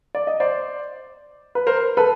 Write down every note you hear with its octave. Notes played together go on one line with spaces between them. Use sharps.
D5
D#5
C5 D5
B4
A#4 C5
A4 B4